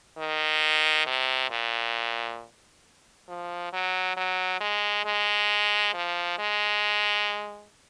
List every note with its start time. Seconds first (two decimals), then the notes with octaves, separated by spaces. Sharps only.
0.18 D#3
1.07 C3
1.51 A#2
3.29 F3
3.73 F#3
4.17 F#3
4.61 G#3
5.05 G#3
5.94 F3
6.39 G#3